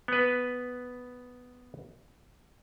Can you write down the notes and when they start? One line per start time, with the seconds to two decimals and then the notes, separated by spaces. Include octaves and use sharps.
0.08 B3 B4